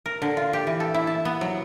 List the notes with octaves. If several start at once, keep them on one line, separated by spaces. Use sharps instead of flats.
A#4
D3
F4
G4
E3
A4
E4
A5
B3
F#3